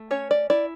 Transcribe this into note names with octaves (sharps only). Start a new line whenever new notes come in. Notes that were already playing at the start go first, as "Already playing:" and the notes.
Already playing: A3
C#4 C#5
D5
E4 D5